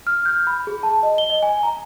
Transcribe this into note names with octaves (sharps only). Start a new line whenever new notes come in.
F6
G6
B5
G#4
A5
D#5
G7
D#5
G#5
A#5